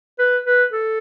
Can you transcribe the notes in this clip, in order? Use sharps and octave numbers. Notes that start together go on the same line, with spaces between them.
B4
B4
A4